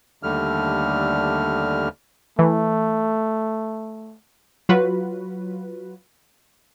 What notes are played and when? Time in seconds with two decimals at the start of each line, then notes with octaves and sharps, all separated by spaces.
0.23 D#2 D3 G3 A3 F6
2.39 E3 A3
4.69 F#3 F4 F#4 B4